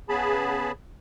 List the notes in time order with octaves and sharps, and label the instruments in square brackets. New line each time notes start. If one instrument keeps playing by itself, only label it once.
[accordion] C#3 B3 G#4 A5 B5